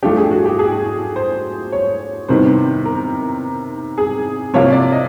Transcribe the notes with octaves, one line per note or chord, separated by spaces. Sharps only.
F3 A3 D4 G4
G#4
F#4
G4
G#4
C5
C#5
C3 D#3 G3 B3 C5
A#4
G#4
C3 F3 A#3 C#5
D5
D#5